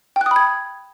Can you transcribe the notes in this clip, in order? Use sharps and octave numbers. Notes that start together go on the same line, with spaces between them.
G5
F#6
D#6
B5
G#6